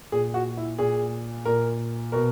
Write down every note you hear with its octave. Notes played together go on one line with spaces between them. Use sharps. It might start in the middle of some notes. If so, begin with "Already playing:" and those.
A#2 G#4
F#4
E4
A#2 G#4
A#2 A#4
B2 A#4